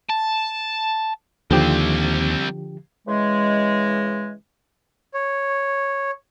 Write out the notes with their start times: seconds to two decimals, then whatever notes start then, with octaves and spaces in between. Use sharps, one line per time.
0.09 A5
1.51 D#2 D3 F3 G3 C4 G4
3.08 C#3 E3 G#3
5.14 C#5